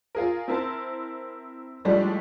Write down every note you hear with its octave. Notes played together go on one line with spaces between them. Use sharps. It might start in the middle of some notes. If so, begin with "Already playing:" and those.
F4 G#4 A#4
C4 E4 A#4 C5 A5
A2 F3 G3 G#3 D4